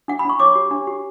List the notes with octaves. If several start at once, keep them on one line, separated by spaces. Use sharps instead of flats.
D4 F#5
B5
D4 C#6
C#5 D6
G4
D4
G4